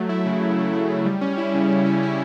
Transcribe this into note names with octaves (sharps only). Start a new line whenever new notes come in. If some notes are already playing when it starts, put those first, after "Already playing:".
Already playing: F#3 A3
E4
C#3
F#3
A3
E4
C#3
G3
C#4
E4
C#3
G3
C#4
E4